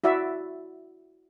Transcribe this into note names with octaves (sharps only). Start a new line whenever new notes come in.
E4 F#4 D5 E5